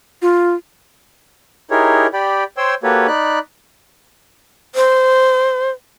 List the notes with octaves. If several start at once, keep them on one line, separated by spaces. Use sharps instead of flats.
F4
D#4 E4 G4 G#4 A#4 C#5
G4 D5 G5 B5
C5 C#5 G5 C6 E6
A#3 F#4 G4 A4 B4 C#5
D#4 D5 B5 F#6
C5